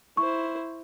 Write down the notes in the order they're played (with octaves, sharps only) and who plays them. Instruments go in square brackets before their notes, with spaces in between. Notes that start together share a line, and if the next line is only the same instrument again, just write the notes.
[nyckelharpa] E4 C5 [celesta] C#6